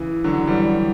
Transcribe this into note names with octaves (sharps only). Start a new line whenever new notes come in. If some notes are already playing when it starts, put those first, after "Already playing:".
Already playing: C#3 E3
D3 F#3
E3 G3